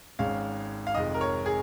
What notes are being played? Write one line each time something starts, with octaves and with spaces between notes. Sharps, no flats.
G#1 G#2 G#3 C#4 F5
F5
F1 F2 D#3 G#3 D#5
A#4
C#5
G#4